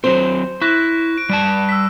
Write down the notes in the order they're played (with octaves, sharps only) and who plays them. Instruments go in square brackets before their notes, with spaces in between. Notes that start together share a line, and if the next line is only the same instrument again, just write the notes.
[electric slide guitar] F#3 C4 [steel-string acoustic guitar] C5
[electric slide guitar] E4 [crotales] C#6 F#6 A#6
[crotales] D7
[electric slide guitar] G3 D5 A5
[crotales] E6 B6